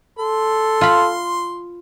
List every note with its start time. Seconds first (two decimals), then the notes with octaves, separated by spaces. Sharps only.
0.19 A4 C6
0.81 F4 B5